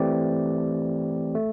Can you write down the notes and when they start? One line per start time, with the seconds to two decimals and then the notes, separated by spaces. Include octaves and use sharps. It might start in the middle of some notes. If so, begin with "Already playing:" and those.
Already playing: E3 A3 C4 G4 D5
1.35 A3